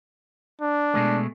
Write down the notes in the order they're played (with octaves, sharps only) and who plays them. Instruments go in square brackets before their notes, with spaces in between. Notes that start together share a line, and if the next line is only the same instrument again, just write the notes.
[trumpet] D4
[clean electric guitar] B2 G#3 A3